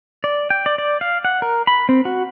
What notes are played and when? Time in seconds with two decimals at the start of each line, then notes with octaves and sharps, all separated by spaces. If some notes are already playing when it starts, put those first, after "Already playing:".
0.24 D5
0.50 G5
0.66 D5
0.78 D5
1.01 F5
1.25 F#5
1.42 A#4
1.67 B5
1.89 C4
2.05 F#4